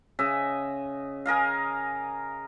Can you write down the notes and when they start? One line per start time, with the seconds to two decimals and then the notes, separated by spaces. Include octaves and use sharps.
0.19 C#3 D#5 E5
1.26 G#4 A#4 D#5 F5